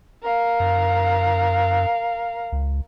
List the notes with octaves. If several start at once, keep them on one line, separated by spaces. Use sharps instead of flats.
A#4 F5
F#2
C#2